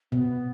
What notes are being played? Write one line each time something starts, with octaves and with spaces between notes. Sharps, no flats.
B2 B3